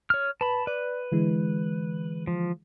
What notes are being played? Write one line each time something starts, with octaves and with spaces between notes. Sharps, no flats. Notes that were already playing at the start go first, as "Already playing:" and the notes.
C#5 F6
B4 A5 B5
B4 D5
D3 E3 G#3
F3